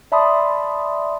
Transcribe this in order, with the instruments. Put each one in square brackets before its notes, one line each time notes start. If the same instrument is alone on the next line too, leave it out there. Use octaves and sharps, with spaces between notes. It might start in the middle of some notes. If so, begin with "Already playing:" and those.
[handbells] D5 E5 A5 B5 C6 D#6